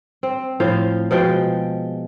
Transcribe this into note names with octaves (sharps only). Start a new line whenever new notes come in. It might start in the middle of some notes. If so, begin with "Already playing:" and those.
C4
A2 F3 C5 F5
B2 F3 G#3 G5